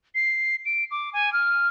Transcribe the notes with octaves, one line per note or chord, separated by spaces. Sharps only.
C7
D7
D6
G#5
F6